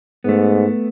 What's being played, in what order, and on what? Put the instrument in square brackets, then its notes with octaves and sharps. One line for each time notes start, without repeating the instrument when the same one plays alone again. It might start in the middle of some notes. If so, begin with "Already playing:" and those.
[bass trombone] G#2 [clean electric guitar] A3 B3